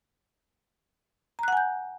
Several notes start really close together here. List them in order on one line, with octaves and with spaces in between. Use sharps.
A#5 F#6 F#5 G#5 G6